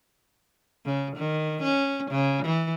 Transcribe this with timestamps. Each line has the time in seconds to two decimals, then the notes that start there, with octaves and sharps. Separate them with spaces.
0.85 C#3
1.16 D#3
1.62 C#4
2.11 C#3
2.45 E3